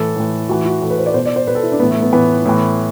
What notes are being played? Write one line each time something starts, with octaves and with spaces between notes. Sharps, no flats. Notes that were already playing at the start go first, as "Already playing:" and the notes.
Already playing: A2 E3 A4
A2 E3
A2 E3 F#4
F#4
A2 E3 A4
B4
C5
D5
B2 C5
D5
C5
B2 B4
A4
E4
D4
A2 E3 B3
A3
B3
A2 E3 B3
A2 E3